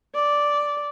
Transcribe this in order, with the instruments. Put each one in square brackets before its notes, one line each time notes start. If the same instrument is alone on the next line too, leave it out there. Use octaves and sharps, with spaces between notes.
[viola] D5